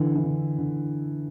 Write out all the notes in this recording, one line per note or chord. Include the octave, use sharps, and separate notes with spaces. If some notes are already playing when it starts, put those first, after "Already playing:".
Already playing: D3 E3
E3
D3
D3